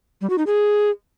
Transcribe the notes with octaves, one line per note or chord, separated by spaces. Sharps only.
G3
F#4
D#4
G#4